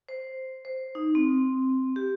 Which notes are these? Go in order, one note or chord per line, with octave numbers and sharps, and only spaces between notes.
C5
C5
D#4
C4
G4